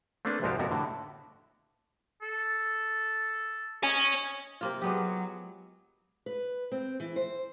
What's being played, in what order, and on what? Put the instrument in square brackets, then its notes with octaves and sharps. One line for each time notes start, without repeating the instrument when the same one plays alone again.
[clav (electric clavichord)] A3 A#3 C4 D4 A4 B4
C2 G#2 F3 F#4 G4 F5
F2 C3 B3 F#4 A#4
A2 D3
[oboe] A4
[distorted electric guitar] C#5 G#5 [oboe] D#5
[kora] C3 A#3 F4
[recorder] F#3 [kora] G#3 B3 G4
[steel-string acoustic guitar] B4
C4
E3
C5